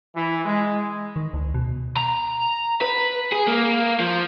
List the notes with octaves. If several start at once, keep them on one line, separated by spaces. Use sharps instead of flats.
E3
G#3
D#3
D2
B2
A#5
B4
G#4
A#3
F3